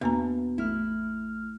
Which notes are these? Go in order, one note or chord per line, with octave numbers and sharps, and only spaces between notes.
E2 B2 A#3 A#5
A1 A3 E4 F6